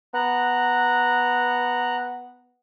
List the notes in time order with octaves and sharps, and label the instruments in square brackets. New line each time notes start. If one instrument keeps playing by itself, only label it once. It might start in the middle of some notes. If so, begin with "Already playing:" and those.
[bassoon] B3 [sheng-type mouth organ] A#5 F#6